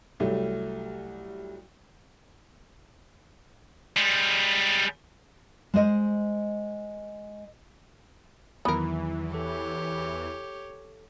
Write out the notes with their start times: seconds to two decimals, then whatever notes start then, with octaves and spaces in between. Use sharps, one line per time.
0.20 C2 F#3 G3 A3
3.97 G3 G#3
5.74 G#3 C5 D#5
8.65 E2 D#3 E3 F#3 B3 E4 A#4
9.34 G4 A4 C#5